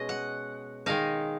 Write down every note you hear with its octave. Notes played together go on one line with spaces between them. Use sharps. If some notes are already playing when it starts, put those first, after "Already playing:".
Already playing: B2 G#3 C#4 D#5
F#5
D#3 G#3 D#4 F5